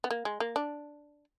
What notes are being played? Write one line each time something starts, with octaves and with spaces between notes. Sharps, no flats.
B3
A#3
G#3
A#3
D4